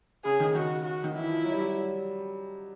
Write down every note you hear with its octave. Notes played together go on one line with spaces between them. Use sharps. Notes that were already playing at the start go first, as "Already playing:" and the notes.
C#3 G#4
D#3
D#3 F#4
F#4
D#3
E3 E4
F3
F#3
G3
F#3